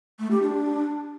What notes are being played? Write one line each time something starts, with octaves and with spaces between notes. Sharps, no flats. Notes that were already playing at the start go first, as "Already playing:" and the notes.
A3
G4
D4